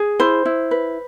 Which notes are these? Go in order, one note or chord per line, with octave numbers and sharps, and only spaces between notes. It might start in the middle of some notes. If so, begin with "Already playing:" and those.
Already playing: G#4
E4 C5
E4
B4